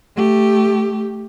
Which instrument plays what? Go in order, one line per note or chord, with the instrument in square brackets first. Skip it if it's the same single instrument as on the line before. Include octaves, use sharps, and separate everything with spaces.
[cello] A3 G4